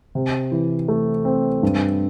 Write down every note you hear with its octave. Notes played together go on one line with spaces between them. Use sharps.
C3
E3
A3
C4
G2